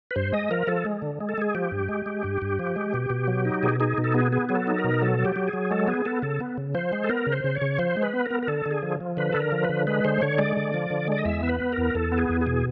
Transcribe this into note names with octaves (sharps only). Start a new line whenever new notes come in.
B4
G2 C5
G#3 D#5
F3 A#4
F3 A4
G#3
D3
G#3
A4
G#3 G#4
F3 G4
G2
G#3
G#3
G2
G2
F3
G#3
B2
B2
F#3
D#4
B2 G#4
D#4 G#4
B2
A4
B3 G#4
B3 G#4
F#3 G#4
A4
D#4
A#4
B2
F#3 A4
F#3
G4
F#3
G#4
F#3
G#3 A4
B3 G#4
B3 A4
C#3 A4
B3
C#3
F3 C5
G#3
A4
B3 A#4
C#3
C5
C#3
C#5
C#3
F3 C5
G#3
B4
B3
B3 A#4
A#4
D3 A4
D3
G#4
F3
F3
D3 B4
D3 A4
A#4
F3
B4
D3
G#3 B4
D3 C5
D3 C#5
G#3 D5
D3
F3
D3
G#3 D5
D#5
E2 E5
B3
B4
B3
A#4
E2
E2 A4
B3
G#4
E2
G#4
B2